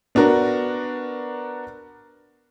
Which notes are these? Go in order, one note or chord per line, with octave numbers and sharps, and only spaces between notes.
B3 D4 F#4 A#4